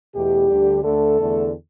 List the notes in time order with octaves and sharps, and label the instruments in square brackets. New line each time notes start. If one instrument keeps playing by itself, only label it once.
[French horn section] E2 B2 A3 G4
D2 D3 G3
D2 D3 A3 A4
E2 D3 A3